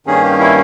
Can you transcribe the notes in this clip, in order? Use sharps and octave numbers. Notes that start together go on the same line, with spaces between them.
G2 D#3 A#3 C#4 G#4
G4
E4